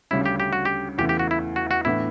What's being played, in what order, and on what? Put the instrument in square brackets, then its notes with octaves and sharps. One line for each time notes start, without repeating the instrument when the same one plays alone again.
[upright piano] D2 C#3 G3 C#4 [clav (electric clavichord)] E4
[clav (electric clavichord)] G4
G4
F#4
G4
[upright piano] E2 C#3 E3 A3 [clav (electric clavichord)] G4
[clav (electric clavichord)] G4
F#4
E4
F#4
F#4
[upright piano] A2 E3 B3 D4 [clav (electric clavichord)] E4